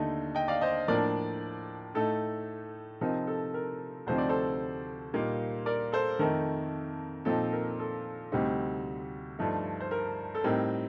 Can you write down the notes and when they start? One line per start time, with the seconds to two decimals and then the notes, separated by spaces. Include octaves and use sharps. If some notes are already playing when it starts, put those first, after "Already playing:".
Already playing: D#2 D3 A3 D#4
0.35 D#5 G5
0.48 D5 F5
0.61 C5 D#5
0.88 A2 F3 A#3 D4 A#4 D5
1.94 A2 A3 D#4 A4
3.01 C3 F3 C4 D#4 A#4
3.27 A4
3.54 A#4
4.07 D2 C3 F3 C4 D#4 C5
4.18 D5
4.29 A4 C5
5.13 A#2 G3 A#3 D#4
5.66 A#4 D5
5.92 A4 C5
6.19 F2 D#3 A3 D#4 A#4
7.25 A#2 F3 C4 D#4 A4
7.53 A#4
7.79 A4
8.32 D2 C3 G3 C4 D#4
9.39 G2 F3 A3 D#4
9.80 C5
9.91 A#4
10.35 A4
10.44 A2 G3 C4 D#4 A#4